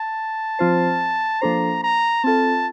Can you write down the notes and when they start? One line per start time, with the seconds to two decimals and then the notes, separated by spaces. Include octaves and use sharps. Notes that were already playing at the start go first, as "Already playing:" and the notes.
Already playing: A5
0.59 F3 C4 F4 C5
1.41 F3 A#3 D4 A4 C5 A#5
1.83 A#5
2.24 C4 F4 A4 A5